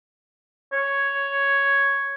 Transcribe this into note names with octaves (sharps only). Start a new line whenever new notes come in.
C#5